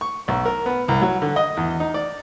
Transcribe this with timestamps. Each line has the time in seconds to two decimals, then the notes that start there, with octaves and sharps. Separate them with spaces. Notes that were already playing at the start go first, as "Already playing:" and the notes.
0.01 C#6
0.28 B1
0.46 A#4
0.66 B3
0.88 C2
1.02 F#3
1.22 D3
1.36 D#5
1.57 E2
1.80 D#4
1.94 D5